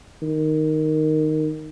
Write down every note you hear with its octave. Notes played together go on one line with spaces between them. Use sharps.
D#3